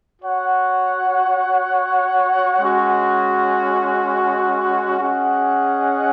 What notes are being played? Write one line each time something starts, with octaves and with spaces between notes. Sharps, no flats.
F#4 C#5 F#5
G#3 C#4 F#4
C#4 G#4 D#5 F#5